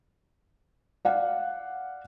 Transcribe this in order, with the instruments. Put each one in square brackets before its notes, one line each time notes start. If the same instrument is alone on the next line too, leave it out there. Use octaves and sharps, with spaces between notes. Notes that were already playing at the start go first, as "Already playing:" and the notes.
[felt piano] D5 F5 F#5